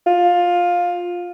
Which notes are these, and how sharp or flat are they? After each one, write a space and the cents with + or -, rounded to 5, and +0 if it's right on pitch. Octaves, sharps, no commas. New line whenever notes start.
F4 +15